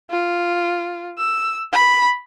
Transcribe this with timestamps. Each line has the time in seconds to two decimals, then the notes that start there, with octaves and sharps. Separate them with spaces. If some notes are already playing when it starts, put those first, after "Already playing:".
0.11 F4
1.18 E6
1.73 B5